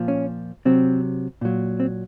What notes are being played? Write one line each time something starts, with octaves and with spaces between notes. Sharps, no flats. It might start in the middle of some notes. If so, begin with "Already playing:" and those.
Already playing: A#2 F3
C#4
C3 F#3 C4
A#2 F#3
C4